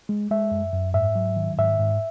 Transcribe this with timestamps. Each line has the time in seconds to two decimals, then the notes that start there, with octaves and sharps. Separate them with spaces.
0.09 G#3
0.31 G#3 E5
0.51 F#2
0.73 F#2
0.94 G#2 E5
1.15 F#3
1.36 D#3
1.58 G#2 E5
1.79 G#2